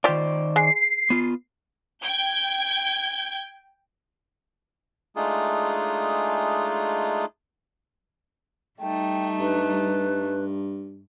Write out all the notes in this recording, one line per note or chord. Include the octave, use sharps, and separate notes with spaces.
D#3 F4 G4 C5 D5
G#3 C7
B3 F4
G5 G6 G#6
G#3 A3 D4 D#4 F4 G#4
G3 A3 D#4 G5
G2 B4